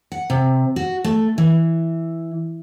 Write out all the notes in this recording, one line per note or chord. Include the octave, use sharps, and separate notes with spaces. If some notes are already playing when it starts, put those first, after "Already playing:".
F#5
C3
F#4
A3
E3